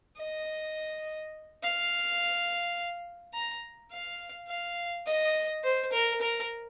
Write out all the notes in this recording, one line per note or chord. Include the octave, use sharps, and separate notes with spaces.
D#5
F5
A#5
F5
F5
D#5
C5
A#4
A#4